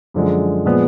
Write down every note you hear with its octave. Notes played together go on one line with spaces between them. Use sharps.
F#2 D3 F3 G#3
A#2 F3 G#3 B3